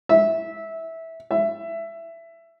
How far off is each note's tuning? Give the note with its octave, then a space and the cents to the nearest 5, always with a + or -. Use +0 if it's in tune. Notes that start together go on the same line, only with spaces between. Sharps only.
E5 -15
E5 +15